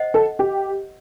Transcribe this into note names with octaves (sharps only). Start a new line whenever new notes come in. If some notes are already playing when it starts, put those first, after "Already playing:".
Already playing: C5 D#5 F#5
A4
G4